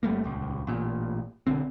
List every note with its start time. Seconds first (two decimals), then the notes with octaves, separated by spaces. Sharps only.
0.03 G1 G3 A3 A#3
0.24 D#1 C#2
0.67 A1 A#2
1.47 B1 D3 C4